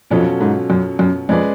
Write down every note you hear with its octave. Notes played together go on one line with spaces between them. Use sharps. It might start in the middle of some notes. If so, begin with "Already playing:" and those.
F2 B2 F#3 C#4 F4 A4
G#2
F#2
F#2
F2 G#3 C#4 G#4 B4 D5